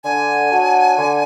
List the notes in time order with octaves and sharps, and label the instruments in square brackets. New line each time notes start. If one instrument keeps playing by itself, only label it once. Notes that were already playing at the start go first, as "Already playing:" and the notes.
[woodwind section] D3 [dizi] G#5
[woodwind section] F#3 D4 F#4
D3